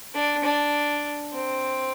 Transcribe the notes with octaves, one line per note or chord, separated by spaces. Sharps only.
D4
D4
C4